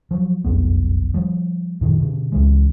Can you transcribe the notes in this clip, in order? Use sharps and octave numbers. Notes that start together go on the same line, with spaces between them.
F3 F#3
F#1 B1 F2 B3
F3 G3
F#2 A#2 D#3
B2 D3
C#2 C#3 E3 G#3